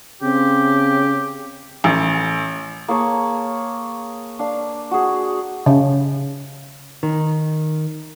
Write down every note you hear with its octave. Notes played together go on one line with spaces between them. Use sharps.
C#3 C4 G4
A1
A#3 G#4 C#5 A5
D4 F5
F#4 G#4
C#3
D#3